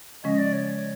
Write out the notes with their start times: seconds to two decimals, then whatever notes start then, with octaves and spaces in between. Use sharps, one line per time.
0.24 C#3 F3 G#3 C#4 D#5
0.38 D5
0.53 C#5